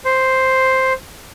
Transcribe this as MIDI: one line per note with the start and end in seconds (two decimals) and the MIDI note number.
0.05 0.93 72